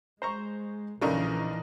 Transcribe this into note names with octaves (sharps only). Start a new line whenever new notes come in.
G#3 C5 A#5 C#6
A#1 F#2 C#3 E3 A3 D4 D#4 A#4